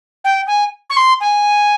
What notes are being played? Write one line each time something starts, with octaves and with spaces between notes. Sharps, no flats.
G5
G#5
C#6
C6
G#5